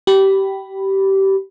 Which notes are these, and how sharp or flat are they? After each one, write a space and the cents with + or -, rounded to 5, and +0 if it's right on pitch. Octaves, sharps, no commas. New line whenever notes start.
G4 -20 B5 +0